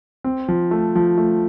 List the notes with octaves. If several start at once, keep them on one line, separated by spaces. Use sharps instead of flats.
C4
F3
A3
F3
A3